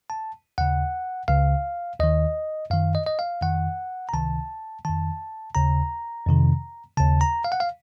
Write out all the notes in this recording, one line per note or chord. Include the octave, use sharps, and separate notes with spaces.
A5
D#2 C#3 F#5
C#2 C#3 F5
D#2 D#3 D#5
F#2 D#3 F5
D#5
D#5
F5
F2 D#3 F#5
A#5
C#2 C3 D#3 A5
F2 D#3 A5
D#2 C#3 A#5
F2 C3 D#3
D#2 C#3 A5
A#5
F5
F#5
F5